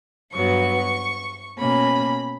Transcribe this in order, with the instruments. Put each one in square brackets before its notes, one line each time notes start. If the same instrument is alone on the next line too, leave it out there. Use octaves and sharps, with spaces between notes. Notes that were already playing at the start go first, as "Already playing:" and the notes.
[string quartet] G2 F#3 B3 C#6
B2 A#3 C#4 B5